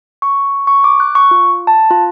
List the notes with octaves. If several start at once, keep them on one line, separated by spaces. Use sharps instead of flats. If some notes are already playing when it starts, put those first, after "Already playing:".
C#6
C#6
D6
F#6
C#6
F4
A5
F4